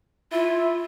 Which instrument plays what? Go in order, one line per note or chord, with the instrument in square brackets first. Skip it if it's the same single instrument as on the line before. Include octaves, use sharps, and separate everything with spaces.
[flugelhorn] E4 [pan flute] F4